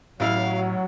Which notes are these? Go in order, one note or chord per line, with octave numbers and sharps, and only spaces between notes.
A1 A2 F#3 E4 F5 F6